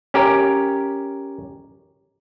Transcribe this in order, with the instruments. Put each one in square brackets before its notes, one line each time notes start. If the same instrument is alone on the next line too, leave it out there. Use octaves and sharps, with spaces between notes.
[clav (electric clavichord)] C#4 G4 A#4